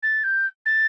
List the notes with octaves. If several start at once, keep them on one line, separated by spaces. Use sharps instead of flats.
A6
G6
A6